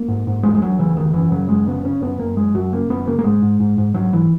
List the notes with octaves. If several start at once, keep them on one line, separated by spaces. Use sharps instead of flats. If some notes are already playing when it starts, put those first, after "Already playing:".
Already playing: A#3
G#2
G#2
E2 G#3
G#3
E2 F#3
C#3 E3
E2 D#3
F#2 E3
C#3 F#3
F#2 G#3
C#3 B3
C#3 C#4
F#2 B3
F#2 A#3
F#2 G#3
F#2 F#3
C#3 A#3
F#2 B3
C#3 A#3
A#3
G#2 G#3
G#2
G#2
G#2
G#2 F#3
G#2 E3